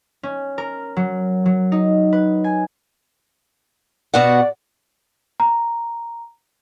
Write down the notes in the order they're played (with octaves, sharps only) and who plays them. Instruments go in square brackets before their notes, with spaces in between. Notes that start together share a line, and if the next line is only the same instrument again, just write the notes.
[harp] C#4
A#4
F#3
F#3
D#4
B4
G#5
[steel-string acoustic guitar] B2 F#4 F#5 [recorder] D5
[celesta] A#5